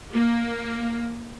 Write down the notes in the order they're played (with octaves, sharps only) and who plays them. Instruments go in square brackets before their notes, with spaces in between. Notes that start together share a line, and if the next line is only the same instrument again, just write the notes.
[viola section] A#3